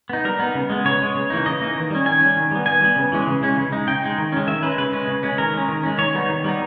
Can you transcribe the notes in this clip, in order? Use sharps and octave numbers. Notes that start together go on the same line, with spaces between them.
B3 D#4
G3 A#4
B3 D#4
C#3
G#3 B3
C#3 C#5
G#3 B3
C#3
E3 A#3 D#4
C#3 D#5
E3 A#3 D#4
D#3
G3 C#4
D#3 G#5
G3 C#4
D#3
G3 B3
D#3 G#5
G3 B3
C#3
E3 G#3 C#4
C#3
E3 G#3 C#4
C#3
G#3 D#4
C#3 G5
G#3 D#4
D#3
G#3 C#4
D#3 E5
G#3 C#4 B4
C#3 B4
G#3 C#4
C#3
G#3 C#4
D#3 A#4
G#3 C#4
D#3
G#3 C#4
D#3 C#5
G3 B3 D#4
D#3
G3 B3 D#4